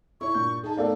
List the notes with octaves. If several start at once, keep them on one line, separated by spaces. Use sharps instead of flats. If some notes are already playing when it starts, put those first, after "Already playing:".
E4 C#5 C#6
G2 A#2 G6
D#4 G#4 A5
A2 B3 C4 A4 D5 F5